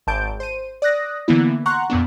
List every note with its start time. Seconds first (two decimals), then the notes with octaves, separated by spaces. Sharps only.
0.07 G#1 A5 G6 D7
0.40 C5 D#7
0.82 D5 D#6 F#6 A#6
1.28 D3 E3 A#3 B3 E4
1.66 F#5 A#5 C6 C#6 F#6
1.90 F2 A#2 B3 D4